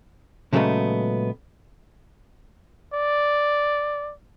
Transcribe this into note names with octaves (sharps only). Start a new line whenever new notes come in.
A#2 C#3 F#3 G#3 A3 B3
D5